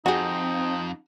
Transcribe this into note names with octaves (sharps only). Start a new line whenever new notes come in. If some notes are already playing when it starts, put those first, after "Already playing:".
F2 C4 D#4 F#4 G#4